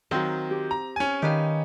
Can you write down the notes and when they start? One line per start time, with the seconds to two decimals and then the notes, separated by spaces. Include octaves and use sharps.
0.11 D#3 F#3 C4 C5 F5
0.50 G4
0.71 A#5
0.96 C#4 G#5
1.22 D#3 G4 B4 F5